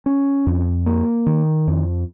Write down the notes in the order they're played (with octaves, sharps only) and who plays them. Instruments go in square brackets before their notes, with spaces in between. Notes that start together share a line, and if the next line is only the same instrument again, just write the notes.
[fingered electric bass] C#4
F2
A#3
D#3
F2